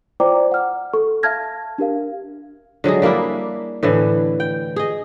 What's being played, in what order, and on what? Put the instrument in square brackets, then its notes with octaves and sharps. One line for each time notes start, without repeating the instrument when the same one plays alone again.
[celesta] F4 C5 D5 G5 A#5 D6
F#5 F6
A4 C#6
E5 F5 A5 F6 G#6 A#6
D4 G4 A#4 F5
[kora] D3 F#3 G#3 G#4
G3 A#3 D4 E4
A2 D3 E3
G5
G#4 D#5